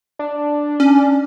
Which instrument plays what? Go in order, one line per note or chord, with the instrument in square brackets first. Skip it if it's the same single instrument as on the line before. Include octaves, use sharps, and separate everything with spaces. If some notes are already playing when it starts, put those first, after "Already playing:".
[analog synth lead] D4
[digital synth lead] C#4